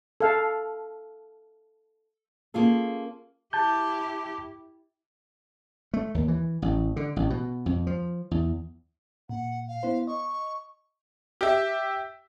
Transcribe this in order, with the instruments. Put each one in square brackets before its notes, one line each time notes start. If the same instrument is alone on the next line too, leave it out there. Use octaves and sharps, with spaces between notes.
[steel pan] A4 F5
[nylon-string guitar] A#3 C#4 F4 G#4 A4
[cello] E4 G4 [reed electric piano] A5 G6
[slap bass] A3
D#2
E3
A1
D3
A1
B2
F2
F3
E2
[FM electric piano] A#2 [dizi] F#5
[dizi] F5
[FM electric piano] B3 E4 C5
[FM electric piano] D#5 [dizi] C#6
[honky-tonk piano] G4 E5